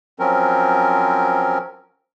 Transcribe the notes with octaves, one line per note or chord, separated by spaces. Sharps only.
F3 F#3 C4 C#4 A#4